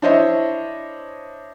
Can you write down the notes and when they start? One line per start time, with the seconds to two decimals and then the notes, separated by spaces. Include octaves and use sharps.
0.02 D4 E4 C5 C#5 D#5 E5